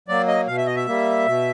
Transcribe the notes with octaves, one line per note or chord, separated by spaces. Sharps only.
F#3 A#3 D5
D#5
B2 F5
E5
D#5
E5
G3 A#3
B2